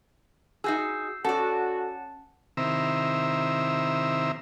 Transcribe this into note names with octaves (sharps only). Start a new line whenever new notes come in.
D#4 F#4 G#4 E6 G6 C7
C#4 F#4 A4 D5 F#5 A5
C3 D#3 C4 E4 E5 A#5